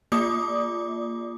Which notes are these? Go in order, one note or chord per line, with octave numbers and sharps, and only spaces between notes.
A#3 F4 D5 D6 D#6